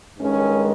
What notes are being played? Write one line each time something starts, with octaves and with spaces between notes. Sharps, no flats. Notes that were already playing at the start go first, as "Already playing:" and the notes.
G2 D#3 G#3 C#4